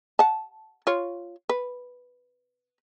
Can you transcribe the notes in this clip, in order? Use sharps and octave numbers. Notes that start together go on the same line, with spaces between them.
F#5 A5
F4 C#5
B4